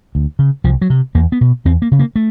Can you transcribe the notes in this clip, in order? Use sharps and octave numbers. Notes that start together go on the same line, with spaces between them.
D2
C#3
C2 F3
F#3
C3
E2 A#3
B3
B2
E2 C4
A#3
C#3
A#3
A3